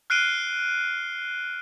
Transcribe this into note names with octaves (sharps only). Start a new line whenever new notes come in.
F6 F#6 C7 D7 D#7 G7